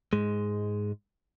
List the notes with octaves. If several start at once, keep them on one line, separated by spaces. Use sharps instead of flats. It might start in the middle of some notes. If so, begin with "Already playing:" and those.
G#2 G#3